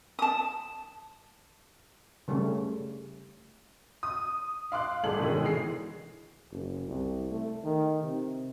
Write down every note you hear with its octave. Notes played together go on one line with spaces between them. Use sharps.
A5 D#6
C#3 G3 A3 C#4
D#6
F5 C6 D6 F#6
G1 A2 G#4 A4 F#7
G#2 B2 D3 D#3 G#3
E3 G#4 C7
F#1
C2
A3
D#3
C3